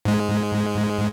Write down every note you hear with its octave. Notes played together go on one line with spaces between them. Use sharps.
G#2 G#3